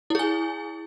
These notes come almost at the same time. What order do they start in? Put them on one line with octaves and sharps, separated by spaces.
E4 G#4 G#5